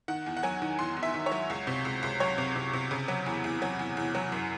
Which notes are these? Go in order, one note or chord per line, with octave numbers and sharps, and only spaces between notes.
D#3 F#5
E2
F#5
F#3 G#5
D#3
E2 C6
E2
E5
D#3
C#5
F#3
C#2
C3
C#2
C#2
F#3 C#5
C3
C3
C3
C#3
F#3
E2
E2
F#3
E2
E2
F#3
F#2